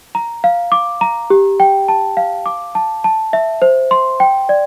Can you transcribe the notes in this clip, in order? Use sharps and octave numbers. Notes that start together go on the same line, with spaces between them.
A#5
F5
D6
A#5
G4
G5
A5
F5
D6
A5
A5
E5
C5
C6
G5
D5